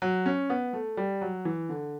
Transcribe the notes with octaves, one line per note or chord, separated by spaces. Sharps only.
F#3
C#4
B3
A3
G3
F#3
E3
D3